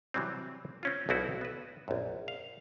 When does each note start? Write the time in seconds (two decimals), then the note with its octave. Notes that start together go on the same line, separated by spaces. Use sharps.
0.14 C3 E3 F#3 G3 C4
0.83 C4 C#4 F4
1.09 B1 B2 C4 E4 F#4 D5
1.41 B3 B4
1.88 A#1 F#2
2.28 F5